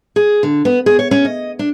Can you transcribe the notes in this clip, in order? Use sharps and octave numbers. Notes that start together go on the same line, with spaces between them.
G#4
D3
B3
G#4
C#5
C#4
D#5
D4